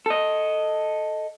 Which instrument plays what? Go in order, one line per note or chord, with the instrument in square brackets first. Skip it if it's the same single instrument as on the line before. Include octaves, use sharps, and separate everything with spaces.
[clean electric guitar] A4 D#5